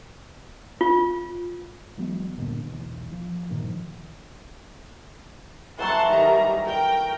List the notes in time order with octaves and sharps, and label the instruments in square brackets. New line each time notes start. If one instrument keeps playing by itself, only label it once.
[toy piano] F4
[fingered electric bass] E3 F#3 G#3 B3
G1 D#2 A#2 D3
E1 B1 E2
F3
G2 A#2 D#3 F3
[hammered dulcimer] E3 F#3 A3 [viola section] F#5 A5 C6
[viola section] D#3 G3 A#5
A#4 G5